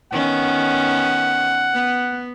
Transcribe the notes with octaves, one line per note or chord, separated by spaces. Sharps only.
D#3 B3 C#4 F#5
B3